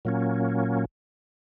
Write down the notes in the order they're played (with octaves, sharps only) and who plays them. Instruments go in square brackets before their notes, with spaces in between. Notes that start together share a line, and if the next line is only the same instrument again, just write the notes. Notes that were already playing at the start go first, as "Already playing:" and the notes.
[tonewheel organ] A#2 F#3 A#3 C#4